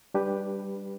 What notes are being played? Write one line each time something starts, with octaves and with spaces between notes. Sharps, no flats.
G3 D4 G4 B4